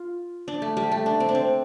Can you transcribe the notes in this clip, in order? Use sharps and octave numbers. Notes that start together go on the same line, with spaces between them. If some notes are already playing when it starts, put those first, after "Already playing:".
Already playing: F4
D4
A3
G3
A3
D4
C4
D4
C4